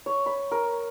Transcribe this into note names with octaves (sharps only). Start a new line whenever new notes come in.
C#5
B5
A#4